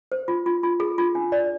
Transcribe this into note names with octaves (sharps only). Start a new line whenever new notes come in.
C5
F4
F4
F4
G#4
F4
D4
D5